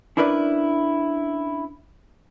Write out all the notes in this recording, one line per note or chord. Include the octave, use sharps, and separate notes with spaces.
C#4 D4 E4 A#4 B4 D5